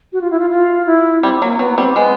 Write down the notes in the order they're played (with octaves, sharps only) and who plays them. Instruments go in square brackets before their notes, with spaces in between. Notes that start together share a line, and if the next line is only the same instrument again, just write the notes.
[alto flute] F#4
F4
E4
F4
F4
E4
[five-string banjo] G3 [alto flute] C4
[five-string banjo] F#3 [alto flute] A#3
[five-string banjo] F#3 [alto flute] B3
[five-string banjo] G3 [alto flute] C4
[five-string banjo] G#3 [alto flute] B3